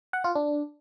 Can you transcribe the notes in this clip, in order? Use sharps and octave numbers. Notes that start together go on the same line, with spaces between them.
F#5
F4
D4